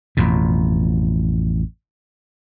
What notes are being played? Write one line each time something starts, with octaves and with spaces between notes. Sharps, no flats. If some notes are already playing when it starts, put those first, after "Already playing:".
A1 F2 B2